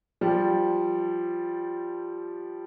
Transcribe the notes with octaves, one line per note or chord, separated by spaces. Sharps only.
F3 G3